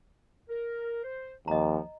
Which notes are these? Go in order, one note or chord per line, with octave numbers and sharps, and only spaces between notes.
A#4
C5
D#2 F3 D#5 A#5